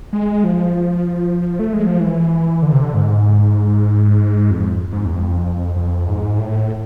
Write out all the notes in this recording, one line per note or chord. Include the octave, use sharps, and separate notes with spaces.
G#3
F3
A3
G#3
F3
E3
D3
C3
D3
G#2
F2
G#2
E2
F2
F2
G#2
A2